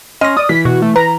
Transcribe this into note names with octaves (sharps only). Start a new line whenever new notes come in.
C#4 D#5 C6 F6 A#6
D5 D#6
E3 B6
B2 F#4
A3
B4 A#5